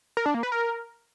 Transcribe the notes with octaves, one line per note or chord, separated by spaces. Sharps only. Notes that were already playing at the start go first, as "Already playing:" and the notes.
A#4
D4
A#3
B4
A#4